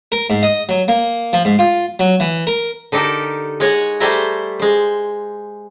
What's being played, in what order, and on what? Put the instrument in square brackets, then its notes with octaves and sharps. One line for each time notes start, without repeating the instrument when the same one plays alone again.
[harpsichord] A#4
G#2
D#5
F#3
A#3
F3
G#2
F4
F#3
E3
A#4
[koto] D3 D#4 G4 A4 A#4
G#3 C#5 D#5 F#5
G3 A3 C5 E5 G#5 A#5
G#3 C5